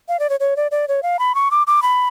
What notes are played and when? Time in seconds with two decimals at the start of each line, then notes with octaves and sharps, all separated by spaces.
0.09 F5
0.20 D5
0.30 C#5
0.40 C#5
0.57 D5
0.71 D5
0.88 C#5
1.03 F5
1.19 B5
1.35 C#6
1.51 D6
1.67 D6
1.82 B5